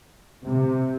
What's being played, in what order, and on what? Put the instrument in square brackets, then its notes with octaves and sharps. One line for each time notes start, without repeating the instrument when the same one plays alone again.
[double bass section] C3